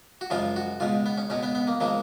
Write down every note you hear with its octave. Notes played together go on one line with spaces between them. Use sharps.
F#4
F#2 C#3 F3 G#3 F4
F#4
C#2 B2 G#3 F4
B3
C#4
C#2 B2 G#3 C#4
B3
B3
A#3
C#3 F3 G#3 A#3